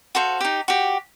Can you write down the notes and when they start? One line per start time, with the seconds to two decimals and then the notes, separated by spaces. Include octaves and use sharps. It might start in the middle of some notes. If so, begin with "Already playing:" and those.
0.15 F#4 A4 C5 F5
0.41 D#4 G4
0.68 F#4 G4